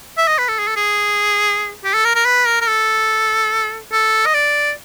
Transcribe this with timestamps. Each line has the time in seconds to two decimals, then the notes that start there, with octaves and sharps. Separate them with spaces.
0.17 E5
0.28 D#5
0.38 B4
0.49 A4
0.59 G#4
0.67 A4
0.76 G#4
1.84 G4
1.94 A4
2.05 A#4
2.15 A#4
2.25 B4
2.46 A#4
2.61 A#4
2.67 A4
3.92 A4
4.26 D#5
4.34 D5